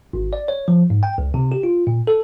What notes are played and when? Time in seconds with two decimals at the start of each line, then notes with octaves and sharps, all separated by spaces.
0.13 G#1
0.33 D5
0.48 C#5
0.68 F3
0.90 G#2
1.03 G5
1.18 C#2
1.34 C3
1.52 G4
1.63 F4
1.87 A#2
2.07 A4